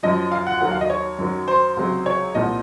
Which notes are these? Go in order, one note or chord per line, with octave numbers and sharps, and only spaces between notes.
F#2 F3 D#5
F5
F#5
D#2 D#3 F#3 F#5
F5
D#5
C#5
F#2 D#3 F#3
C5
C#2 C3 F#3
C#5
C2 A#2 F3 D#5